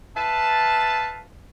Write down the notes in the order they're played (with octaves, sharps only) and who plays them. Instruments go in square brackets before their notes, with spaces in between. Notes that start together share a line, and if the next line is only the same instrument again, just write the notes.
[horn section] B4 E5 F5 A5